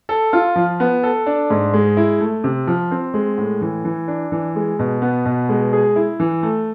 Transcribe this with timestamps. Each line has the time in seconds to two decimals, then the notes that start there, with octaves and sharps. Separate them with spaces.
0.09 A4
0.33 F4
0.56 F3
0.80 B3
1.03 A4
1.26 D4
1.50 G#2
1.74 G#3
1.97 E4
2.20 A3
2.44 C3
2.67 F3
2.91 C4
3.14 G#3
3.38 A2
3.61 E3
3.85 E3
4.08 D4
4.32 E3
4.56 G#3
4.79 B2
5.02 B3
5.25 B2
5.49 G#3
5.73 G#4
5.96 E4
6.20 E3
6.43 A3